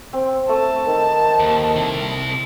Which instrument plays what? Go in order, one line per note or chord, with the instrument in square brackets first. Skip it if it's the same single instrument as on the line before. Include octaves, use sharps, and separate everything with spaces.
[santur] C4
[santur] A3 [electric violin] A5
[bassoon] D#3
[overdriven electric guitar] D#2
C3 E4